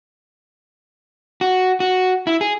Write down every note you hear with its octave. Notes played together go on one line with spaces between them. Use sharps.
F#4
F#4
E4
G#4